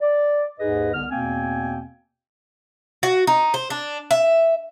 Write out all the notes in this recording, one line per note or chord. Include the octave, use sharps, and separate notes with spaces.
D5
D#2 G#2 D#4 G#4 B4 D#5
C2 D3 B3 F6
E2 B2 A#3 C4 G5 G#5
F#4
D#4
C5
D4
E5